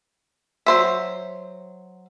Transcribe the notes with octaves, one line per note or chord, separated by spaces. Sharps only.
F#3 C5 E5